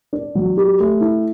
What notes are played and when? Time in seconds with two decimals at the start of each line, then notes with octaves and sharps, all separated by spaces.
0.13 D4
0.35 F#3
0.57 G4
0.80 A3
1.01 E4